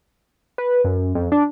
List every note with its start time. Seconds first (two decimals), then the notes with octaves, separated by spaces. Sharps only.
0.58 B4
0.85 F#2
1.15 F2
1.32 D4